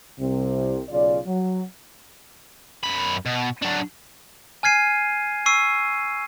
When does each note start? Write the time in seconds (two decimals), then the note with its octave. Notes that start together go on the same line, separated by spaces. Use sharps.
0.20 C2 C3
0.90 B1 C#3 F4 D5
1.27 F#3
2.84 F#2 B5
3.26 B2
3.62 F#3 D4
4.63 G#5 F6 G#6 C7 D#7
5.46 C#6 E6 C7 D#7